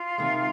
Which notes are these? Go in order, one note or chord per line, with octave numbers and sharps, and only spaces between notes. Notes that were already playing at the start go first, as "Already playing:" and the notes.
Already playing: F4
C3 D#3 G#3